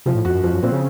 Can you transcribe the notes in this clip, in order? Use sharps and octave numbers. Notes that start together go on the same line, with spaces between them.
C3 F3
A2
F2 F#4
F#2
F2 F3
F#2
A#2 C4
C#3